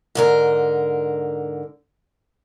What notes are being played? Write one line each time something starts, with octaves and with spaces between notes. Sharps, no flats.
G#2 D3 A#4